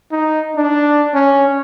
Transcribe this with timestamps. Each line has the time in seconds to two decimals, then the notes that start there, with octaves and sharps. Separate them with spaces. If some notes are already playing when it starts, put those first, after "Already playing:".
0.12 D#4
0.56 D4
1.14 C#4